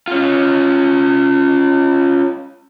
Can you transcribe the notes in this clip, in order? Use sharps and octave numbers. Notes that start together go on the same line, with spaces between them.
C#4 F4